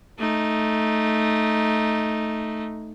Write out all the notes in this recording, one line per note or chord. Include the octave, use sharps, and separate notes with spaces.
A3 D#4